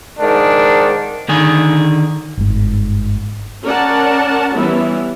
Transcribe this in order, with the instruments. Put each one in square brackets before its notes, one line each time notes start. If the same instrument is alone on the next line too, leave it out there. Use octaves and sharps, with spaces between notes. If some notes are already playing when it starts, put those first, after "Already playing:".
[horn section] G#2 D#3 D4
[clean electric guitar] D3 D#3 G#4
[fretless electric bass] G1 G#2
[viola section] C#4 A#4 D5 F#5 A5
E3 G3 B3 C#4 E4